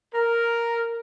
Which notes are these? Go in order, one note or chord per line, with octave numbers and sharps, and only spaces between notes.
A#4